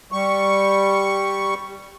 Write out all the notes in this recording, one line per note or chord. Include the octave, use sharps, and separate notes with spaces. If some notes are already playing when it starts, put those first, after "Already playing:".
G3 C#6